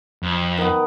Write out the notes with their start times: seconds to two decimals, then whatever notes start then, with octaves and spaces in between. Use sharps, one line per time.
0.23 F2
0.58 D#3 B3